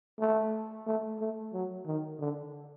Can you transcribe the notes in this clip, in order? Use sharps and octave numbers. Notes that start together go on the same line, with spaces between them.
A3
A3
A3
F#3
D#3
D3